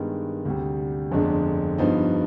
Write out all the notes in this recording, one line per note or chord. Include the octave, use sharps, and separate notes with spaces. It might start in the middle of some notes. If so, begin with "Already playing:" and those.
Already playing: G2 D#3 G#3 B3
D2 C3 G3
G1 F2 D3 G#3 D4
G2 F3 B3 D#4